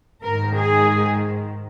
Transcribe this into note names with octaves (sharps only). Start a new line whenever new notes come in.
G#2 D#3 A#4
G#4